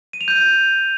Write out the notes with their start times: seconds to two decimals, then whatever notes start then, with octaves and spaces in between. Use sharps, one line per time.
0.13 D#7
0.21 F7
0.28 G6